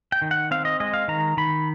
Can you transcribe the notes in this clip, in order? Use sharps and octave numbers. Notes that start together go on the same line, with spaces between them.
G5
D#3
F#5
C4 F5
D#5
G#3 D#5
F5
D#3 A#5
D#3 B5